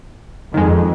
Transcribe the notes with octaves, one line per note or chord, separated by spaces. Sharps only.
F2 D#3 G#3